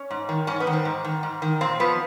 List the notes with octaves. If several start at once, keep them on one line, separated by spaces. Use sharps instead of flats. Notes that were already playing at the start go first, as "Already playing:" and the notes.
Already playing: C#4
G#2
D#3
G#2 C#4
B3
D#3
C4
G#2
D#3
G#2
D#3
A#2 C4
F3 B3